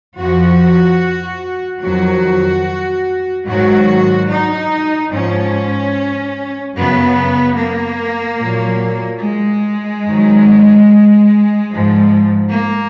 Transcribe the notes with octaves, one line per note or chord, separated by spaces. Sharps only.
F2 F3 F#4
F2 D#3 F#3 F#4
G#2 D#3 F#3 F#4
D#4
G#2 F3 C#4
F#2 C#3 F#3 B3
A#3
A#2 F#3
G#3
G#2 D#3 F#3
G#2 F3
A#3